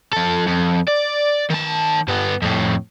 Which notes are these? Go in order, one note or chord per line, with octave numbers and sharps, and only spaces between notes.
F3 A4
F2
D5
D#3 A5
G2 B3
F2 A2